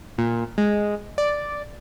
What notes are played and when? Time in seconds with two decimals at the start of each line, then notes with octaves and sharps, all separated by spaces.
0.18 A#2
0.58 G#3
1.18 D5